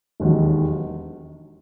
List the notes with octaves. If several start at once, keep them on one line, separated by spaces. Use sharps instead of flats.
E1 D#2 D#3 F#3